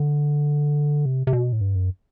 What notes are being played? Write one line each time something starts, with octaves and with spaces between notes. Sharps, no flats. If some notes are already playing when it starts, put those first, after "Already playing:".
Already playing: D3
C3
C3
B2
A2
G2
F#2